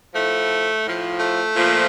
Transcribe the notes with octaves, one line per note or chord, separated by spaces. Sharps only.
A2 F3 A3
A2 F3
A3
A#2 F3